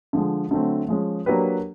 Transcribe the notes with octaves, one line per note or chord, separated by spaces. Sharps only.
D3 F3 G#3
D3 F#3 A3 C4
F3 G#3 C#4
F#3 A#3 D4 G4 B4